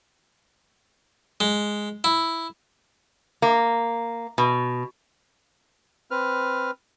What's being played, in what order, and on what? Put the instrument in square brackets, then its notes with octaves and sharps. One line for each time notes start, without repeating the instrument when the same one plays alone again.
[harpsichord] G#3
E4
[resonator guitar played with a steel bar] A#3
B2
[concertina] C4 B4 F6